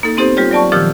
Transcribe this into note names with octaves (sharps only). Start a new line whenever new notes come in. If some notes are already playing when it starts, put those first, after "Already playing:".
A#3 D#4 A4
B3 C4 D#4 G4 A4 C5
G3 F4 G4 C#5
F#3 D5 A5 C#6
A#2 D#3 F3 G4 E6 F6